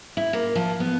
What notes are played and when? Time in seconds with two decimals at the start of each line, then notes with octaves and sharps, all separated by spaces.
0.17 E4
0.33 A#3
0.55 F3
0.80 B3